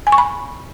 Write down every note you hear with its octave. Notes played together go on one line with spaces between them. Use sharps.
G#5
C#6
B5